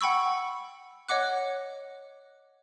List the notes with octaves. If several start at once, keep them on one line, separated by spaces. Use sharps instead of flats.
F#5 G5 B5 C#6 E6
C#5 D#5 F#5 D6 F#6